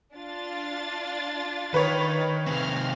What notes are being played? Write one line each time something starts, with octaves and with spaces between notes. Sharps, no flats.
D4 F4 A6
D#3 B4 C#5
C3 D#3 C4 F5 F6